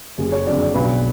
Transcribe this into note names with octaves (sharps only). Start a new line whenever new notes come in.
F#1 G#4
C#5
F2 D3 F#3 D5
D5
B1 B4